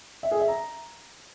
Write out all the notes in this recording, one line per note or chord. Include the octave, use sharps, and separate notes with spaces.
E5
G#4
E5
A#5